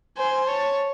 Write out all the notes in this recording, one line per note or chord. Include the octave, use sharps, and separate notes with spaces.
C5 G#5
C#5 A5